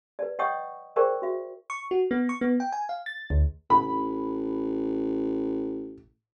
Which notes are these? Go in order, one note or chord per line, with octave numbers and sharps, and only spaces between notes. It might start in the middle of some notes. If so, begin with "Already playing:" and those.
B4 D5
C#5 D#5 F#5 G5 C#6 D#6
G#4 A#4 C5 D5 G5 C#6
F#4 E5
C#6
F#4
B3
C#6
B3
G5
G#5
F5
A6
D2
A1 B5